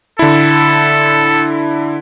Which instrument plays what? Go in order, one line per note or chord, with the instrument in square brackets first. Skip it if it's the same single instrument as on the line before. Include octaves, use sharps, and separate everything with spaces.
[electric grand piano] D3 E4 [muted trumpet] A4